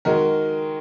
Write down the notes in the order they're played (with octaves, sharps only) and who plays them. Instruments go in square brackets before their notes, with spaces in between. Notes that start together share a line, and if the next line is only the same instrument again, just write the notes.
[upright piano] D#3 G#3 F#4 A#4